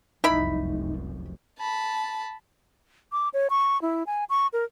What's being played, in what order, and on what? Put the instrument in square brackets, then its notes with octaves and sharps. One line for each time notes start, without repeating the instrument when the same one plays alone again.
[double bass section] F1 C2 F#2 [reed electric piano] D#4 [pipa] E4 B5
[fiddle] A5 B5
[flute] D6
C#5
C#6
E4
G#5
C#6
A#4